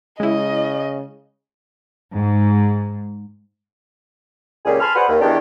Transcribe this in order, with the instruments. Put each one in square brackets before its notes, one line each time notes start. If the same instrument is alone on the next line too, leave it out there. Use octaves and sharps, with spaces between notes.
[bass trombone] C#3 [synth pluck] G#3 E4 [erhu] D#5
[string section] G#2
[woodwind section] C#2 A#2 G3 C#4 G#4
G#5 A5 B5 C6 F6
G#4 B4 C5 D5 F#5
D#2
E2 D#3 D4 G4